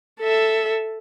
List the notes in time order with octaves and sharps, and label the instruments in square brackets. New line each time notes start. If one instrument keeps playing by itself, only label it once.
[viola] A4 E5